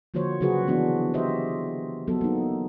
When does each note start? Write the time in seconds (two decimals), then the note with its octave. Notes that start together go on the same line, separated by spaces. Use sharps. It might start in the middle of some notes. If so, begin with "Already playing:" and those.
0.14 D3 F3 A#3 F#4 C5 C#5
0.41 C#3 F#3 F#4 G#4 B4
0.67 E3 B3 D4 F#4
1.14 G4 C5 D#5 E5
2.08 F#3 B3 A4
2.21 A#3 D#4